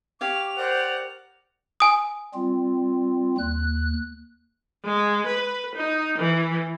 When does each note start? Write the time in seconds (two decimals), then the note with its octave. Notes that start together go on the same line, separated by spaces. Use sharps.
0.21 G4 C#5 F5 D6 F7
0.57 A#4 C5 D5 F#5
1.80 G#5 D#6
2.34 G3 C4 F4
3.38 D#2 F#6
4.85 G#3
5.27 B4
5.75 D#4
6.18 E3